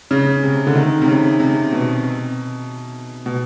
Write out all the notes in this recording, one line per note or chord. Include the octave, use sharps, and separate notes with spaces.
C#3
C3
D3
D#3
C3
C#3
C3
B2
B2